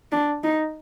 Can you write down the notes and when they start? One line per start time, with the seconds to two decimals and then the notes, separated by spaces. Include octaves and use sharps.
0.12 D4
0.43 D#4